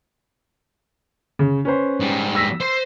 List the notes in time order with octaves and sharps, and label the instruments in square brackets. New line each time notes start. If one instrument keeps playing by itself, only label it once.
[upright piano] C#3
C#4 B4 C5
[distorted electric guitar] G#2 G3
[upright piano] E6 A#6 B6
[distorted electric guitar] C5 C6